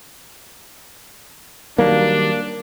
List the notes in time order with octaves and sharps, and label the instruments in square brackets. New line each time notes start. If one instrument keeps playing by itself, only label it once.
[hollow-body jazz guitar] D#3 F#3 G3 [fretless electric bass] A#3 [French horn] D4